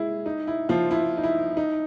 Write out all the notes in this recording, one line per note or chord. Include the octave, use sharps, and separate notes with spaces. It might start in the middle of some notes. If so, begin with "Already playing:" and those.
Already playing: G#3 E4 G#4
D#4
E4
F3 F4
E4
D#4
E4
D#4